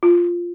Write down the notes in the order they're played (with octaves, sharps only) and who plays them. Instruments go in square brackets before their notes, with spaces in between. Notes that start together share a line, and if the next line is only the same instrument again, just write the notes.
[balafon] F4